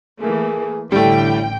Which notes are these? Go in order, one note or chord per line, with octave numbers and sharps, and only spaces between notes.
E3 A3 A#3 G#4
A1 A2 D3 G3 A3 G5